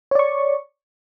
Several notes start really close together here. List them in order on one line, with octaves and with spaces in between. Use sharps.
C#5 D5 C#6